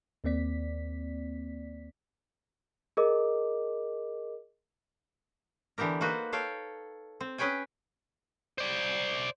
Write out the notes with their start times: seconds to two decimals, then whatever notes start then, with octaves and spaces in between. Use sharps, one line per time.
0.24 D#2 A#3 C4 D5 B6
2.97 G#4 A#4 D#5 D6
5.78 D3 E3 B3 G4 A#4
6.01 A#3 D#4 F#4 B4 C5
6.32 A4 C#5 F5 G5
7.21 C4
7.38 C#4 G#4 B4 C#5 G5 G#5
8.58 C5 D5